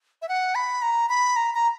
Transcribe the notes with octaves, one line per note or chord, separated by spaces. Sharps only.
E5
F#5
B5
A#5
B5
A#5
A#5